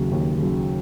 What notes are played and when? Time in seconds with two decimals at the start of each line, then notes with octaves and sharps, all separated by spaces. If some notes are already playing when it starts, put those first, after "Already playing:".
Already playing: D#2 C#3 F#3
0.12 D#2
0.39 C#3 F#3